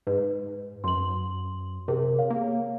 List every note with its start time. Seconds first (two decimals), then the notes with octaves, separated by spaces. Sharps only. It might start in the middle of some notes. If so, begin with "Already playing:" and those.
0.07 G#2 B4
0.84 F#2 C6 F#7
1.88 C3 G#4 A#4
2.18 C#5 F5
2.30 A#3